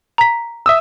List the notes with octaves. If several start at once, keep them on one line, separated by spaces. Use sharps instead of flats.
A#5 B6
E5 D#6 E6